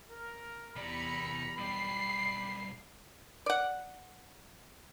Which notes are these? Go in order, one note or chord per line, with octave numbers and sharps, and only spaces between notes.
A#4
E2 C3 G3 D5 A#5 B5 C#7
B1 G3 D5 B5 C7
D5 F#5